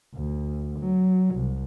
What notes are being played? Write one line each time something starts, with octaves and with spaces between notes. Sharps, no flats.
D2
F#3
C2